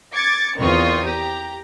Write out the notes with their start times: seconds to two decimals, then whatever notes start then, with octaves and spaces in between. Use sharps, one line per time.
0.14 D6 G#6 A6 C#7
0.57 E2 D#3 C4 F4 C#6 D#6
1.04 G4 A#5